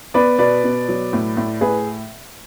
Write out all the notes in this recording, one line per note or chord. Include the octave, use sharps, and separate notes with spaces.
B3 B4 D5
B2 B4 D5
B2
F#3
A2
A2
A2 G#4 B4